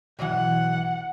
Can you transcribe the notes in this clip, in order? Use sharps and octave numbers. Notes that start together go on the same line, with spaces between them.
B1 E3 F#5